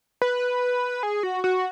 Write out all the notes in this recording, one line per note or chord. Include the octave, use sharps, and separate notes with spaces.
B4
G#4
F#4
F#4